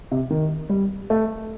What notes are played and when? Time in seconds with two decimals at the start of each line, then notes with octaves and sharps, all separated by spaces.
0.11 C3
0.30 D#3
0.69 G3
1.10 A3